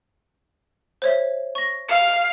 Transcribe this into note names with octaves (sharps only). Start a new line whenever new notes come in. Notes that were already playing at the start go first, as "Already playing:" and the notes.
C5 C#5 E5
C#6 A#6
F5 C#7